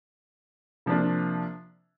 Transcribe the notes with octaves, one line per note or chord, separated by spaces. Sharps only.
C3 F3 A#3 D4 F4